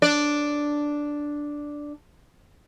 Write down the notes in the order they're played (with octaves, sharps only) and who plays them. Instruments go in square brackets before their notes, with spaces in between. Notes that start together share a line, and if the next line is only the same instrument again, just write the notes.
[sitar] D4 D5